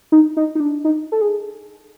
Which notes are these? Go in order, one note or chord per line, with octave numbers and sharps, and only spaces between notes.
D#4
D#4
D#4
D4
D#4
A4
G#4